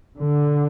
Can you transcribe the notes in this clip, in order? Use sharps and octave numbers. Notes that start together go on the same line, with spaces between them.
D3